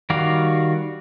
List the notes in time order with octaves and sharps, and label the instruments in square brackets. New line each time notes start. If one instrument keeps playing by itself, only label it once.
[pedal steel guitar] D#3 G3 F#4 D5 F5